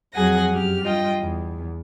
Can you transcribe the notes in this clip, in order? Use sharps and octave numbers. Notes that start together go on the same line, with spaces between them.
F2 F#3 G#4 F#5 G#5 A#6
F#2 G4 F6
G2 F4 D#5 G5
E2